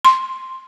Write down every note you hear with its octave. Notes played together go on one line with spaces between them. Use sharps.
C6